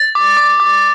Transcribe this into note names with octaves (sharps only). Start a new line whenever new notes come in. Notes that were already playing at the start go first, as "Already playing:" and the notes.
Already playing: A6
D6
D6
D6